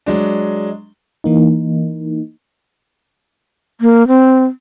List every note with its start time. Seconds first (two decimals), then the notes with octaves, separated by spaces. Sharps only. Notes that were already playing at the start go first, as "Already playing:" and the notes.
0.06 F#3 G#3 D4
1.24 E3 A#3 D#4
3.81 A#3
4.08 C4